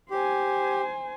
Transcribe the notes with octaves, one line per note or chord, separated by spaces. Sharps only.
G4 C5 G#5